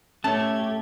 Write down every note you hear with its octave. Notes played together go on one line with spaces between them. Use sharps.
A2 A3 C#4 G4 C#5 A5 G#6